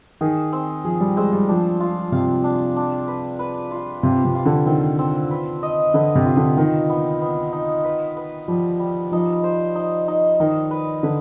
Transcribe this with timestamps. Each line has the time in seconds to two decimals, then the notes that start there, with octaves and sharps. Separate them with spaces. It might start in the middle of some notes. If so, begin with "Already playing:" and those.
0.21 D#3 G#4
0.53 C4
0.84 F3 G#4
1.01 G3
1.17 G#3 C4
1.33 G3
1.49 F3 D4
1.80 F4
2.12 C3 F5
2.44 D4
2.76 D4
3.08 B4
3.39 B4
3.71 F4
4.03 C3 F4
4.25 C3
4.35 F4
4.45 D3
4.66 D#3 C4
4.99 C4
5.31 B4
5.63 D#5
5.94 D3 B4
6.15 C3
6.25 F4
6.37 D3
6.57 D#3 D#4
6.90 B3
7.21 B3
7.53 D#4
7.84 B4
8.17 B4
8.48 F3 G3
8.80 G3
9.12 F3 D#4
9.44 C5
9.76 D#4
10.08 D#4
10.40 D#3 D#4
10.71 B4
11.03 D3 B4